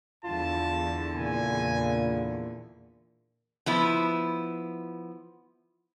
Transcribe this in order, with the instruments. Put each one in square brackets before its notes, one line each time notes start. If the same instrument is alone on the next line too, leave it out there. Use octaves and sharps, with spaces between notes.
[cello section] E2 D3 E3 [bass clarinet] F4 [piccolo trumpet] A5
[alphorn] A#2 [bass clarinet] C#3 [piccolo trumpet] G#5
[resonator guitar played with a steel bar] F3 B3 E4